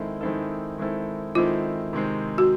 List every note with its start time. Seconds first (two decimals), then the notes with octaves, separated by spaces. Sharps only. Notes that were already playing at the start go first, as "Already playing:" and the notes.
Already playing: D#3 G#3 C4 E4 A4
0.21 D#3 G#3 C4 E4 A4
0.78 D#3 G#3 C4 E4 A4
1.35 D#3 G#3 C4 E4 F4 A4
1.93 C3 D#3 G#3 C4
2.38 F#4